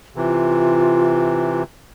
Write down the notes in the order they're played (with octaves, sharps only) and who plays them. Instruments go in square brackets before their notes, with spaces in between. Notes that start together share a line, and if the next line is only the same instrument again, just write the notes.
[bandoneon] C3 E3 [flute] F4